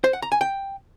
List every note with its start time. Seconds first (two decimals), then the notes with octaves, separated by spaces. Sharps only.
0.04 C5
0.13 F#5
0.22 A#5
0.32 G#5
0.41 G5